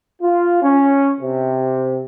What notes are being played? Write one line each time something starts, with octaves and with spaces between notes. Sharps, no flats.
F4
C#4
C3